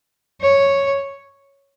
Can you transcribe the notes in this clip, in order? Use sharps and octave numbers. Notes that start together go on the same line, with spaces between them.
C#5